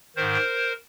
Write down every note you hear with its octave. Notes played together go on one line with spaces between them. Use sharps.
G#2 D#3 A#4 C5